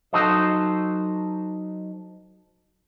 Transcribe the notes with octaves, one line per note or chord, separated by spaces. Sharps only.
F#3 D#4 F#4 A4 C5 D#5